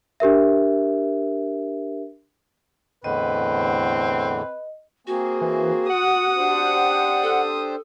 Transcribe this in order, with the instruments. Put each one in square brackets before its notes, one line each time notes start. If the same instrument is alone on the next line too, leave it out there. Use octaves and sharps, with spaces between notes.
[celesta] D4 G4 A#4 E5
[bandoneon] E2 A2 D3 [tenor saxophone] C4 [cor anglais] B4 [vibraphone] D#5
[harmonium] A#3 C4 G#4 [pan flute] F#4
[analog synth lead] E3
[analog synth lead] F#5 [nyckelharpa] D#6
[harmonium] D4 G4 C5
[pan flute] A4